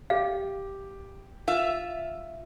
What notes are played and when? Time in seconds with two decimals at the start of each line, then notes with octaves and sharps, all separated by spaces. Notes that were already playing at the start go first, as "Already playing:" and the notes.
0.10 G4 F5
1.48 F4 E5